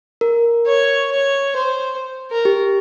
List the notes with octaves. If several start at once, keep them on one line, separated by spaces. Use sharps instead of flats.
A#4
C#5
C#5
C5
A#4
G4